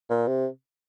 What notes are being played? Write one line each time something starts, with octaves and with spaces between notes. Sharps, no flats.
A#2
C3